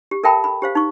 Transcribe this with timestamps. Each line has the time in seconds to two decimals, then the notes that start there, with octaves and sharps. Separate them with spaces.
0.11 G4
0.24 A4 A#4 E5 G5 A5 B5
0.44 B5
0.62 G4 C5 F5
0.75 D#4 C#6